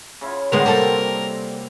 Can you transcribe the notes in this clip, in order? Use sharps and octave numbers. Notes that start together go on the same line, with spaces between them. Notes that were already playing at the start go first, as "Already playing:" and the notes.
C#3 E4 F4
D3 G#3 B3 C4 F#4 A#4
C3 G3 A#3 A4